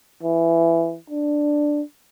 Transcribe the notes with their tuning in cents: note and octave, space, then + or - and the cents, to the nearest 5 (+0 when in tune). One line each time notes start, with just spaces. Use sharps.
E3 +15
D4 +5